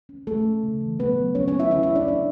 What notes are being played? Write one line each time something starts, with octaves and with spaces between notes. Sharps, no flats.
C#4
A3 A4
C#4
C#3
E3
F#3 B3 B4
F#3
F#3 C#4 C#5
C#4 C#5
B3
E4 E5
D3 E4 E5
E4 E5
C#4
D4 D5
C#4 D4 D5